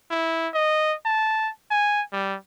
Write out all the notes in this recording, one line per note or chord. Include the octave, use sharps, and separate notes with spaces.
E4
D#5
A5
G#5
G3